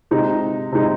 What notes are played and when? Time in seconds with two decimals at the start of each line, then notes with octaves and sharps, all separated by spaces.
0.11 C3 G#3 D#4
0.72 C3 G#3 D#4